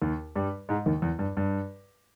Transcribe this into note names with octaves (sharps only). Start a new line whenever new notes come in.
D#2 D#3
G2 G3
G#2 G#3
D#2 D#3
E2
G2
G2